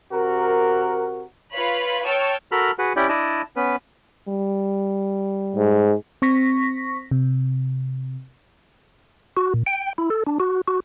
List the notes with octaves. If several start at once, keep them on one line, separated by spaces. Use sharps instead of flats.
C3 F#4 A#4
F4 B4 C#5 F5 B5
C#5 G5 A5 C#6 E6 F6
F#4 A4 A#4 B5 F6
F#4 G#4 B4 F#5
C#4 E4 G4 D5 G5
D4 E4 D5 D#5 A5
B3 C#4 B4
G3
G#2
C4 C#6 A#6 B6
C3
F#4
A#2
G5
E4
A4
D4
F#4
F#4